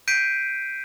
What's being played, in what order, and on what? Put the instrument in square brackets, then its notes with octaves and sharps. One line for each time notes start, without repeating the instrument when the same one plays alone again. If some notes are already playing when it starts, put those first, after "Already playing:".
[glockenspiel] G6 B6 C7 D7 D#7